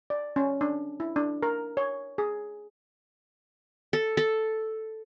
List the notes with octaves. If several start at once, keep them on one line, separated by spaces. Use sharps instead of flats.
D5
C#4
D4
E4
D4
A#4
C#5
G#4
A4
A4